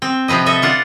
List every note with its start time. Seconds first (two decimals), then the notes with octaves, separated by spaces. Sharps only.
0.02 C4
0.28 C3 F3 B4 D#5
0.46 A4 D#5 E5
0.62 D4 F4 F#5